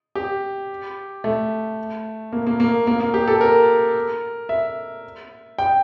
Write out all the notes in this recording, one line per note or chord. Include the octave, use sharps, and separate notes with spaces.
G4
A3
A#3
A#3
A#3
A#3
A#3
G4
A4
A#4
E5
G5